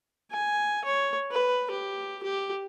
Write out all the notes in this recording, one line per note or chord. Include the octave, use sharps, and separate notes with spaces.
G#5
C#5
B4
G4
G4